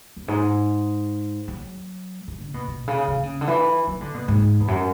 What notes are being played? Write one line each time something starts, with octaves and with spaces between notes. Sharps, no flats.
F#2
G#2
F#3
E3
D3
B2
B2
C#3
C#3
D3
C#3
D3
E3
F#3
D3
B2
G#2
E2
F#2